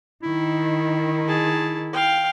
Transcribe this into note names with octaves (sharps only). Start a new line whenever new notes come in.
D#3 E4
G#4 A5
F5 G5